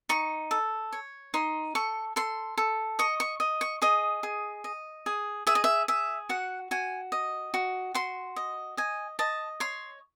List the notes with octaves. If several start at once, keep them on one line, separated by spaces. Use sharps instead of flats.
D#4 C#6
A4
C#5
D#4 C6
A4 C#6
A4 C6
A4
D#5 C#6
C#6
D#5
C#6
G#4 D#5
G#4
D#5
G#4
G#4 E5
D#5
E5
G#4 E5
F#4 F#5
F#4 G#5
D#5
F#4
F#4 C6
D#5
D#5 G#5
D#5 A5
C#5 C6